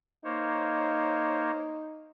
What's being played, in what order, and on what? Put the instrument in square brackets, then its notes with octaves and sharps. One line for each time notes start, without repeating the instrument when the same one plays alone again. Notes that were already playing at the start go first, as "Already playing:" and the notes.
[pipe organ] A#3 C5 C#5 [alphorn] D#4